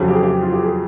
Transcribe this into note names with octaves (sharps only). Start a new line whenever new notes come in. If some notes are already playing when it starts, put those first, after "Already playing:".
Already playing: F2 C#3 F#3
G4
G#4
G4
F4
G4
G#4